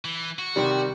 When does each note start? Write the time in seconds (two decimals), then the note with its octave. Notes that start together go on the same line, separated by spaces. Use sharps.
0.05 E3
0.39 F#4
0.56 C3 D#3 G3 G4